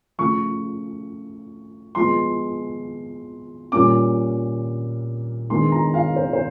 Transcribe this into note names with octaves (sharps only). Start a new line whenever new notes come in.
C#3 F3 A3 C#6
F3 G#3 B3 C6
A#2 G3 A#3 C#4 D6
D#3 G#3 B3 D4 C6
A#5
F5
C5
C5